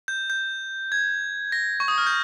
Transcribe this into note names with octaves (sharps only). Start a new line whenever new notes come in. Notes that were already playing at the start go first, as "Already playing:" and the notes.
G6
G6
G#6
A#6
C#6
D#6
F6
G6